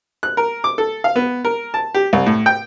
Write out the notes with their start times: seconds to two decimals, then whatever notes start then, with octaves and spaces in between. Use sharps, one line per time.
0.23 F#6
0.37 A#4
0.64 D6
0.78 A4
1.04 F5
1.16 B3
1.45 A#4
1.74 A5
1.94 G4
2.13 C2
2.26 A2
2.46 G5